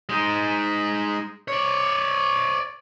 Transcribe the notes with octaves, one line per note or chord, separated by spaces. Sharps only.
G#3 D#4
C#5 D5